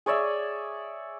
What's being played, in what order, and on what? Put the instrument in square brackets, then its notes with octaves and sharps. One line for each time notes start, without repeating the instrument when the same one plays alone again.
[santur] G#4 C#5 D5 E5